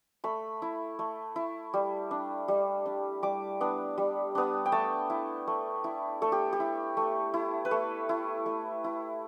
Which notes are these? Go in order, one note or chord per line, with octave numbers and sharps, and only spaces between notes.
A3 B5
E4
A3
E4
G3
D4
G3
D4
G3 D6
B3 D4
G3
B3 D4
G5
A3 A5
E4
A3
E4
A3 A4
G4
G4
E4
A3
E4
B4
A3 A4
E4
A3
E4